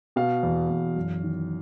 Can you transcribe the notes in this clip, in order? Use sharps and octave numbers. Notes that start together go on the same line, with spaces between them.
B2 F5
E2
E2
F#2
D#3